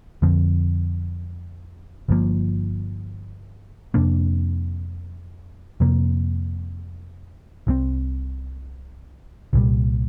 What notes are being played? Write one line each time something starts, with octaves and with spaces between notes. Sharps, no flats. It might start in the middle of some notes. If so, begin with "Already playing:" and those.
F2 D3 F3 C4
G1 G2 F3 A#3
F2 C3 A#3 D4
F2 C3 A#3
C2 C3 F3 C4
C2 A#2 G3